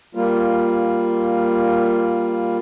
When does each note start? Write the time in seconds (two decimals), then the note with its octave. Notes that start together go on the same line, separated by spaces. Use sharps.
0.15 G3 A#3 F4